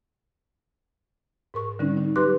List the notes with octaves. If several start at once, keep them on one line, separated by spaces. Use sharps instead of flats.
G#2 A#4 C#6
D3 G3 C4 C#4 D#4
D#4
F#3 G4 B4 C6 D6 F#6